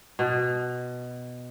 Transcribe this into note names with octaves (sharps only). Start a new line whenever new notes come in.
B2